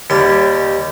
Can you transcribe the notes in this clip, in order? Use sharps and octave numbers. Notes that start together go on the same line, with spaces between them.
D#2 G3